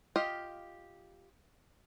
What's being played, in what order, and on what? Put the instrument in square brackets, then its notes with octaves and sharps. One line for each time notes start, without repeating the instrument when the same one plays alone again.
[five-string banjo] F4 G4 D#5 F5